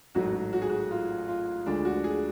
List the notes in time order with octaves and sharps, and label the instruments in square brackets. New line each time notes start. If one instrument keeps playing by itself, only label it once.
[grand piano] A1 G#2 F#3 A3 F#4
F#4
G#4
F#4
F4
F4
D2 D3 F3 G#3 D4
F#4
G#4